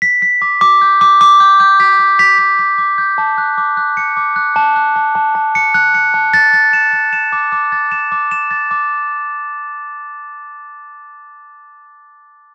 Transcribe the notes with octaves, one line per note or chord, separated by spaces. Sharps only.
B6
B6
D6
D6
G6
D6
D6
G6
G6
B6
G6
B6
B6
B6
D6
G6
A5
F#6
D6
F#6
C#7
D6
F#6
A5
F#6
A5
A5
A5
C#7
F#6
C#7
A5
A6
A6
E7
A6
E7
D6
D6
A6
E7
D6
E7
A6
D6